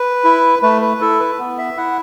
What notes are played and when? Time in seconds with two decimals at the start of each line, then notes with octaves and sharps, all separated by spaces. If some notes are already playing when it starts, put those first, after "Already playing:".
Already playing: B4
0.25 E4
0.62 A3 B4
0.82 B4
1.01 E4 A4
1.20 B4
1.39 B3
1.58 E5
1.77 E4 F#5